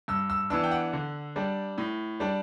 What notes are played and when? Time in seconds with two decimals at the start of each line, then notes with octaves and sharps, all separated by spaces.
0.08 G2 E6
0.30 E6
0.50 E3 B3 D4 E6
0.64 G5
0.71 F#5
0.93 D3
1.36 G3 D4
1.78 A2
2.20 G3 D4